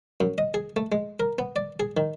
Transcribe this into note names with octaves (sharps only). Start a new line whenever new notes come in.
F#2
D#5
G#4
A3
G#3
A#4
B3
D5
G#4
D#3